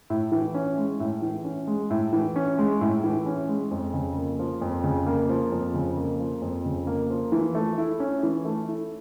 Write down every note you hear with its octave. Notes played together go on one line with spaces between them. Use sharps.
A2
E3
C#4
G#3
A2
E3
C#4
G#3
A2
E3
C#4
G#3
A2
E3
C#4
G#3
F2
C#3
A#3
F3
F2
C#3
A#3
F3
F2
C#3
A#3
F3
F2
C#3
A#3
F3
E3
A3
E4
C#4
E3
A3
E4